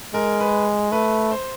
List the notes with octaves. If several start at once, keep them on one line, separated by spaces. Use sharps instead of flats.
G#3 A#4
B4
A3 B4
C5